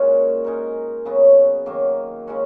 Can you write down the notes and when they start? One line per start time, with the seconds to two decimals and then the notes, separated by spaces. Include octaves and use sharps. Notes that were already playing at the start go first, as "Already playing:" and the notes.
Already playing: A#2 G#3 C#4 F#4
0.44 G#3 D#4 A#4
1.05 C#3 F#3 B3 D#4
1.66 D#3 F#3 A#3
2.27 C#3 G#3 C#4 F#4